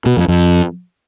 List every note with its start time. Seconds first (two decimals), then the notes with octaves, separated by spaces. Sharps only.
0.06 B2
0.17 F2
0.28 F2